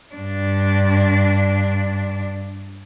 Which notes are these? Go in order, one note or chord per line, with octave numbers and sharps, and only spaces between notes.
G2 D4